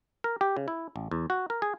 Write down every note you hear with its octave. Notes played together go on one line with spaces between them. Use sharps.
A#4
G4
C#3
E4
A1
E2
F#4
A#4
G#4